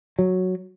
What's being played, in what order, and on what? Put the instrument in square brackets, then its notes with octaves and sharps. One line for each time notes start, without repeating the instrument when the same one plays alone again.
[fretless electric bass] F#3